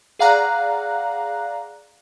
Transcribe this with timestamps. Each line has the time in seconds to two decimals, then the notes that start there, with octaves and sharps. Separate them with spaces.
0.19 G#4 D5 F5 F#5 A#5 F#6